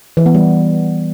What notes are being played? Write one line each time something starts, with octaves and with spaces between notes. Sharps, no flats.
E3
B3
G3